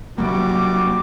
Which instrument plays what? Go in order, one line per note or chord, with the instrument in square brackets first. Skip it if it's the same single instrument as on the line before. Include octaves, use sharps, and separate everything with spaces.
[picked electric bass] C3 F#3 A#3 [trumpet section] G3 F#4 D6